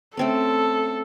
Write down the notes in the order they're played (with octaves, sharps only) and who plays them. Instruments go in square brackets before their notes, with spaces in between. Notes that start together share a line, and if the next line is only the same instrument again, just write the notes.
[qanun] A3 C4 C#4 [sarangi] A4